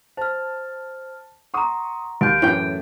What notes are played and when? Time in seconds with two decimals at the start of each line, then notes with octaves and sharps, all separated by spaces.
0.17 C5 A5 F6
1.54 F#5 A#5 C6 C#6 D#6
2.21 D#2 G6 D7
2.42 F#2 A2 E3 G5